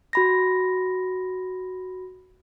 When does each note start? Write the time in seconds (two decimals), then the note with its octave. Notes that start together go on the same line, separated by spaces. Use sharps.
0.13 F#4 B5 A#6